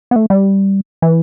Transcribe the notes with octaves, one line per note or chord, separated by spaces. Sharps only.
B3
A3
G3
E3